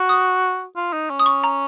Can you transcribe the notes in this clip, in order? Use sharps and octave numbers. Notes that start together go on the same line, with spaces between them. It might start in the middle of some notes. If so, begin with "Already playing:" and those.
Already playing: F#4
D#6
F4
D#4
C#4
D#6
C#6
A#5